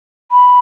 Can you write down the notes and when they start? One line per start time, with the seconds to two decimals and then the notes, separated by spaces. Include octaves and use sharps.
0.32 B5